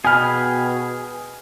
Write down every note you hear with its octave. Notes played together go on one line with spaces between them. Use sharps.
B2 G#4 G5 G#5 B5 F6